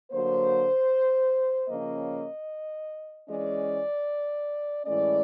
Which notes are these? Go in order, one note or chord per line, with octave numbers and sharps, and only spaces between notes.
D3 F#3 A#3 C5
C#3 F3 A#3 C#4 D#5
E3 G#3 C#4 D5
A2 E3 G#3 C#4 D5